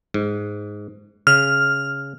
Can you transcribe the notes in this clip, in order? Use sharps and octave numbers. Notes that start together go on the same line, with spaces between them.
G#2
C#3 F6